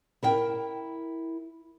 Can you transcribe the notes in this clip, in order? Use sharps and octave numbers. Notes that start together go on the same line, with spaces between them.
E4 A#4 G5